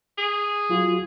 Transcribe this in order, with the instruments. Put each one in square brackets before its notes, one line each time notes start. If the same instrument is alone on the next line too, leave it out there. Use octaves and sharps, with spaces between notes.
[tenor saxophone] G#4
[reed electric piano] F#3 F4 F#4